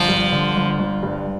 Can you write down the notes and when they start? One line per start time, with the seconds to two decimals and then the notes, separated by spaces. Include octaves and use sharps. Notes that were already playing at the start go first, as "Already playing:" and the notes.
Already playing: G1 F3
0.09 G2
0.32 D3
0.56 G1
0.79 G1
1.03 G2